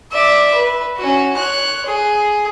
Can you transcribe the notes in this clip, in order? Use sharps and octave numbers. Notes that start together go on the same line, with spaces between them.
D5 E5
B4
C#4 F#4
C#5 F#6
G#4